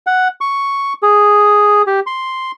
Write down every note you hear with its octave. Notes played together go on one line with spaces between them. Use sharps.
F#5
C#6
G#4
G4
C6